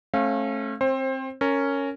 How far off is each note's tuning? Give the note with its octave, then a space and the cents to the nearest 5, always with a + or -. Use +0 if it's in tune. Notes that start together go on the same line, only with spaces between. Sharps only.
A3 -20 C#4 -40 F5 +0
C4 +15 C5 +30
C#4 +0 A#4 -15